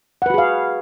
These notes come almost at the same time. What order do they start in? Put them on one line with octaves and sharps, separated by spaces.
F#5 B4 F#4 G#4 F5